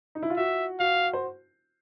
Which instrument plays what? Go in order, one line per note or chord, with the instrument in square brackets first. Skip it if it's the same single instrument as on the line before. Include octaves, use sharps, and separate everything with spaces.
[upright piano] D#4
E4
F4
[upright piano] F#4 [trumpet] E5
[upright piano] F#4 [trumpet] F5
[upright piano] C5